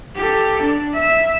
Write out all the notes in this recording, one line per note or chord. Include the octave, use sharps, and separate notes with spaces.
G4 A4
D4
E5